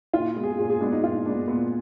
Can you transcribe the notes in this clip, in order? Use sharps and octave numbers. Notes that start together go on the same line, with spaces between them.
A#2 F4
G#3 B3
G#4
A#2 G#4
G#4
G#3 B3 D4
D#4
A#2 F4
G#3 B3 D4
A#2 B3